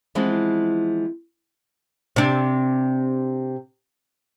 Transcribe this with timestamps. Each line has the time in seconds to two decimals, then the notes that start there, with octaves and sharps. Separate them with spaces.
0.15 E3 F3 G#3 B3 C4
2.16 C3 D4